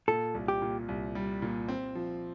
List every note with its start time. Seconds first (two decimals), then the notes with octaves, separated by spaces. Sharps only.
0.08 A#2 A4
0.34 C2
0.48 G4
0.62 A#2
0.88 C2
1.15 G3
1.42 A#2
1.68 C4
1.95 F3